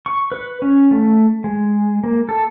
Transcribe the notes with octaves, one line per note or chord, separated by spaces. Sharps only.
C#6
B4
C#4
A3
G#3
A#3
A4